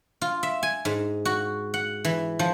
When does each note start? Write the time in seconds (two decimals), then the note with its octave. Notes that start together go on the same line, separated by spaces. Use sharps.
0.21 F4
0.43 E5
0.63 G#5
0.85 G#2
1.25 F#4
1.74 F#5
2.04 E3
2.39 F3